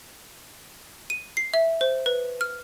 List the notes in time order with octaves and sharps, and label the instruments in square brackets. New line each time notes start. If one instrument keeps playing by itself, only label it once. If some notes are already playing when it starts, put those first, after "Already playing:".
[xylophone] D#7
C7
E5
C5
B4
F6